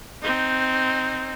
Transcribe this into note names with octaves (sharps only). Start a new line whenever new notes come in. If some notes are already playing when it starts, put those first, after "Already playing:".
C4 D#4